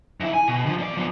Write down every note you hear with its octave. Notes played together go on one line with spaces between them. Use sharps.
F2 E4
G#5
B2
D3 F3
E2 D5
F3 B3